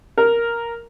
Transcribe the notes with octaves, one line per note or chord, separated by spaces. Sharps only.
A#4